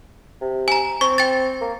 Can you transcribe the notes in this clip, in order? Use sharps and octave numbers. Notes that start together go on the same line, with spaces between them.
C3
G#5 A#5
C4 C#6
G5 A6
A#3